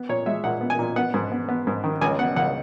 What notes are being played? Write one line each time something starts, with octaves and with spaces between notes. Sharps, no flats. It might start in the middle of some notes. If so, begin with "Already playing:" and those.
Already playing: B3
A#2 C#5
G#3 E5
A#2 F#5
B3
G#5
A#2
B3 F#5
G#2
B3
B3
G#2
D#3
C#2 G#5
B3 F#5
C#2 F#5